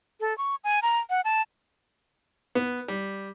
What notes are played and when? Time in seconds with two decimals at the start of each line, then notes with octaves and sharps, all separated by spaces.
0.20 A4
0.38 C#6
0.64 G#5
0.82 A#5
1.10 F#5
1.25 A5
2.55 B3
2.88 G3